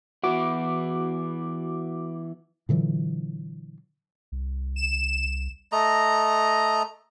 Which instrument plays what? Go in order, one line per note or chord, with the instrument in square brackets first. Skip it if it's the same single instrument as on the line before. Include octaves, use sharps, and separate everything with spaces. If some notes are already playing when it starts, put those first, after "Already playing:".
[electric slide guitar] E3 B3 E4 [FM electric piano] F#4 D6
[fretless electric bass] A#2 D3 E3 F#3
[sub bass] C2
[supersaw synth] E7
[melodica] A3 D#5 A#5